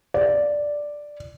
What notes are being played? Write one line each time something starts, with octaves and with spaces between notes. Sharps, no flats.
D5